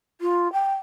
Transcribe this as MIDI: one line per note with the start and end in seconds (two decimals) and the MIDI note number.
0.21 0.51 65
0.52 0.74 79